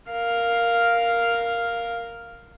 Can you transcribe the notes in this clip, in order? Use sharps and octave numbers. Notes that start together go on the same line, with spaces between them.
A#4 F5